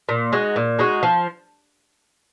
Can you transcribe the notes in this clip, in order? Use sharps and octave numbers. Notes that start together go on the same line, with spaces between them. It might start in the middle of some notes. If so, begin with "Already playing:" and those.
A#2
G#3 D#4 F#4
A#2
G#3 D#4 F#4
F3